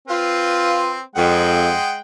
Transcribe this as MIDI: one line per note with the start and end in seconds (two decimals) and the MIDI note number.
0.08 1.00 60
0.08 0.93 65
0.08 1.00 71
1.16 1.73 41
1.16 1.99 56
1.16 1.99 78
1.16 1.99 79